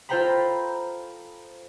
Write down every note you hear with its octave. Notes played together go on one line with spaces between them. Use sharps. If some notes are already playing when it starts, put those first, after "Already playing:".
F4 A4 C5 G5 A#5 B5